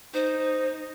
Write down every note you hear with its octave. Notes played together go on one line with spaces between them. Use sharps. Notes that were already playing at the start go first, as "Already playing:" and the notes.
D#4 C5